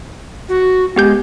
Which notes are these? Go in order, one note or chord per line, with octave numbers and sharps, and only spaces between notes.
F#4
G#3 B3 G4 G6